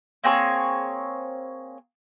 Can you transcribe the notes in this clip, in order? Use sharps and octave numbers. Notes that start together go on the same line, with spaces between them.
A#3 C4 G#4 C#5